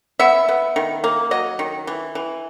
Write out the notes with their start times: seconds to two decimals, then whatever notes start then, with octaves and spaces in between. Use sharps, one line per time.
0.19 B3 E5
0.49 B3
0.76 D#3
1.04 A#3
1.31 F#3 D#5
1.59 D#3
1.87 E3
2.15 E3